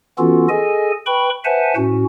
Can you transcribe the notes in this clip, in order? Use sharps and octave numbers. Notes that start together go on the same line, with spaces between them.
E3 B3 C#4 F4 F#4 A4
G#4 A4 D#5 G#5
B4 G5 B5 C#6
B4 C5 E5 F#5 G#5 A5
A2 C#4 F#4